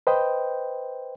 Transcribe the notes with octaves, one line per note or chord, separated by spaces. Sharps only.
B4 C5 D#5 G5